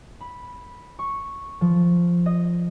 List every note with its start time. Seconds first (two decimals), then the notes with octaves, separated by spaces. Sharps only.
0.21 B5
0.99 C#6
1.61 F3
2.26 D#5